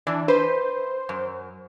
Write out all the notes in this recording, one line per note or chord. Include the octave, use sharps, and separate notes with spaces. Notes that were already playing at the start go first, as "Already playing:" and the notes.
E3 D4
B4 C5
F#2